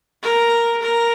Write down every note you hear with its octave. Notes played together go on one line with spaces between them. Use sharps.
A#4
A#4